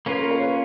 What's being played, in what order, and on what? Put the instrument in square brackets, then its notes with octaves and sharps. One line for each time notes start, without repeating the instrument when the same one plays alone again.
[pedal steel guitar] A#3 C#4 F4 [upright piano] B4
[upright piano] A#4
C#5
B4